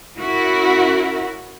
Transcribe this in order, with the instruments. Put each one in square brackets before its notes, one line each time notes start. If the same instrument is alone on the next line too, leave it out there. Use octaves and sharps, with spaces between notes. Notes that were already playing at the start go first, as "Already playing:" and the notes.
[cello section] C#4 E4 F#4 A#4